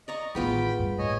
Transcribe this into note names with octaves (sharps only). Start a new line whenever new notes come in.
D5 D#5 A#5 C#6
A1 D#3 G#3 B3 F4 G5 B5
G2
A1 A2 C#5 D#5 G#5